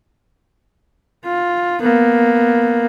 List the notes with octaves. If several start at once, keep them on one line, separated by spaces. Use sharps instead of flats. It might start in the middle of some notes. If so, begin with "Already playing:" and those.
F4
A#3 B3